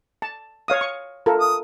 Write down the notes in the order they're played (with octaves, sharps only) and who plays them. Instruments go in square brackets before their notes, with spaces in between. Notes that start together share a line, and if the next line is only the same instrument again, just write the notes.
[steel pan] A5
C#5 F5 D#6
C#6
F4 A4 A#4
[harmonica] D#6